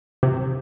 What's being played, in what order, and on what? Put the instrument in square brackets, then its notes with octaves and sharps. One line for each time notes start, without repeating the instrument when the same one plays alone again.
[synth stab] C3